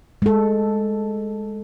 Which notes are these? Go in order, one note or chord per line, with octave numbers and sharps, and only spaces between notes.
G#3 A4